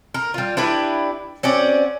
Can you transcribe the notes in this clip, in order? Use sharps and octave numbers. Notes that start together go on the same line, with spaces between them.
A#4
G3 F4
D4 E4 G4 B4
C4 C#4 F#4 D5